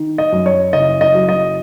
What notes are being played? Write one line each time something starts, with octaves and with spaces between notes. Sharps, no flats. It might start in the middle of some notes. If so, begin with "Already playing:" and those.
Already playing: D#3
D#5
F#2
C#5
F#1 D#5
D#5
F#3
D#5